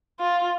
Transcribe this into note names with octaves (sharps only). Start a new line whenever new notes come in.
F4